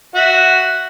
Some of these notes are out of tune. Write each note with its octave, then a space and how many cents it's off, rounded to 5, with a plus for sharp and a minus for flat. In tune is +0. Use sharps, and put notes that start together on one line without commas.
F#4 +0 E5 -5